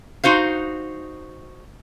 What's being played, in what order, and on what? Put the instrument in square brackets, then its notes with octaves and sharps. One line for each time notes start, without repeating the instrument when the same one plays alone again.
[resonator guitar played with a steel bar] D#4 F#4 C5 F5